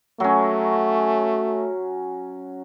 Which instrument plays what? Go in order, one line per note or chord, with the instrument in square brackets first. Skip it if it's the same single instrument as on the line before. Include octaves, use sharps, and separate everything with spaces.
[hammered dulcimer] F#3 C#4 [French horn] A3